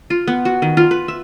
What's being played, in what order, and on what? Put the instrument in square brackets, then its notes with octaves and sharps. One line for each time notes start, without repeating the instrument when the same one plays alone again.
[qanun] F4
B3
F#4
D#3
F4
B4
E5